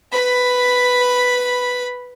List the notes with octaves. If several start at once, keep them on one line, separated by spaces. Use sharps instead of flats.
B4 B5